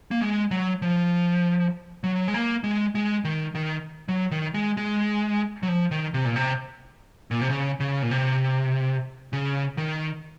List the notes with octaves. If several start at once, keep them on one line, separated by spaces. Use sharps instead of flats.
A#3
G#3
F#3
F3
F#3
G#3
A#3
G#3
G#3
D#3
D#3
F#3
D#3
G#3
G#3
F#3
F3
D#3
C3
A#2
C3
A#2
C3
C#3
C#3
A#2
C3
C#3
D#3